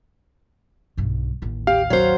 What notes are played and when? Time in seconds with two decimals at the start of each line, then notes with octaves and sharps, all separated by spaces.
0.97 B1 G2
1.42 A1 D#2
1.67 G4 F5
1.90 F#3 C5